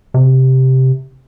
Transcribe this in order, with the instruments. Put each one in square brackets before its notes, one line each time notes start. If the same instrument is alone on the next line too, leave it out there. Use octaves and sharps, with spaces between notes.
[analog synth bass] C3